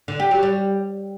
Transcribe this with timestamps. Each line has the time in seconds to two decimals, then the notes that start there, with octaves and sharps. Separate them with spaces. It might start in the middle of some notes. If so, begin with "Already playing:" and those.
0.08 D3
0.20 G4
0.31 F#3
0.43 G3